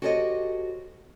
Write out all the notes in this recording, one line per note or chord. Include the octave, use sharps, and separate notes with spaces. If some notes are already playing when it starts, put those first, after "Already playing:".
F#4 G4 A4 C5 C#5 D#5